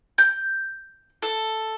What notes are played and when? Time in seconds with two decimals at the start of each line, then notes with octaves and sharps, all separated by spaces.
0.18 G6
1.22 A4